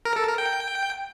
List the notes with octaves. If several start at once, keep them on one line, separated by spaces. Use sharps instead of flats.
A#4
A4
A#4
G5